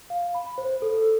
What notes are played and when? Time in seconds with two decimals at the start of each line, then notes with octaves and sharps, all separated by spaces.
0.10 F5
0.35 B5
0.58 C5
0.82 A4